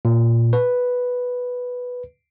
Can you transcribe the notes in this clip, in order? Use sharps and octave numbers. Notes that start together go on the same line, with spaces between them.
A#2
B4